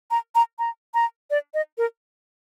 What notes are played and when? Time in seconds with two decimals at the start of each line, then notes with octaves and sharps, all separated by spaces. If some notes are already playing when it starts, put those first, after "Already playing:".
0.11 A#5
0.35 A#5
0.59 A#5
0.94 A#5
1.31 D5
1.54 D#5
1.78 A#4